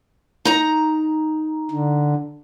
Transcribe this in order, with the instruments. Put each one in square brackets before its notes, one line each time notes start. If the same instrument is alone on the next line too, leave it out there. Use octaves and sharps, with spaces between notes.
[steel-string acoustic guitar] D#4 A#5
[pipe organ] D3